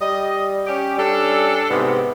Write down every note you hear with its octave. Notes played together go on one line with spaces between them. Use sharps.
G3 D#5
C#4 G4
G3 C#4 D4 A4
G#2 C3 B3